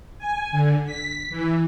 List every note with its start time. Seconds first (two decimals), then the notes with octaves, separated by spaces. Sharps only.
0.18 G#5
0.52 D3
0.86 B6
1.30 E3